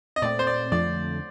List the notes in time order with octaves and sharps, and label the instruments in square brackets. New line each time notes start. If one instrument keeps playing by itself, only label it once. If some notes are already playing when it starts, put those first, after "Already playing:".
[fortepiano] D#5
[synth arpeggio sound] A#2 A3 C4 [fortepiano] D5
[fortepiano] C5
D5
[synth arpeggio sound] F2 D3 F3 A3 [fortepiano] D5